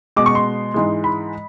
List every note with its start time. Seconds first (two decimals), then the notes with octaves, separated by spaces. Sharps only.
0.16 B2 G#3 D6
0.26 C#6
0.35 C6
0.74 G#2 E3 G#3
1.04 B5